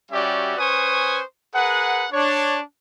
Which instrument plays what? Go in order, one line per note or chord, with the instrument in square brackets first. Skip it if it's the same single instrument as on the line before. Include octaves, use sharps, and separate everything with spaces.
[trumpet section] G3 C#4 F#4 G4 D5 E5
C#4 B4 C5 G#5 C#6 D#6
G#4 A#4 B4 F#5
D4 C#5